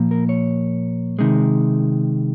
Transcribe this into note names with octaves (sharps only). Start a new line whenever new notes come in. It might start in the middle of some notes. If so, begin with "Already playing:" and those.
Already playing: A#2 F3 A#3
A#4
C#5
C3 D#3 G#3